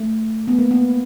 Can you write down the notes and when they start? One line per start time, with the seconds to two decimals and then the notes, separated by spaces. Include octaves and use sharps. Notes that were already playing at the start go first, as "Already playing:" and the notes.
Already playing: A3
0.48 B3
0.59 A#3
0.71 B3